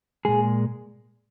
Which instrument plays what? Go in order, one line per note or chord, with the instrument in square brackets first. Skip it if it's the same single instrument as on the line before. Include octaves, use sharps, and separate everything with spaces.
[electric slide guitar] A#2 G#3 G#4